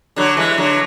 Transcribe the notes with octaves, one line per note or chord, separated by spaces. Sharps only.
D3 F#3
E3 G#3
D3 F#3